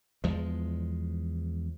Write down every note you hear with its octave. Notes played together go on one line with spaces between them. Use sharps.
E2 F3 G#3